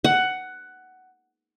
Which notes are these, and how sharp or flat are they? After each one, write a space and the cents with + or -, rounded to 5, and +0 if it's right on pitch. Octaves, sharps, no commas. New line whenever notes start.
F#5 +10